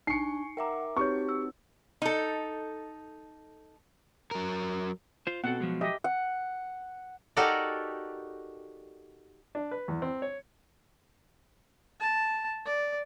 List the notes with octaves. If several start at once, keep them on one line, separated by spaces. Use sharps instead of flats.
D4 D#4 G#5 C#6 C7 C#7
A#4 E5 F#5 G5 A#5 D6
C4 D#4 F#4 G4 B4 C#5 C#6
E6
D#4 A4
F#3 A#4
F4 C5
B2 C4 A4 F#5
F3 F#3 G#3
G4 D#5 E5
F#5
D#4 F#4 G4 A4 A#4 D5
D4
B4
E2
C4
C#5
A5
D5